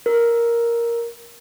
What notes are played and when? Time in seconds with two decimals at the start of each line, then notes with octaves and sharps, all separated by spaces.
0.06 A#4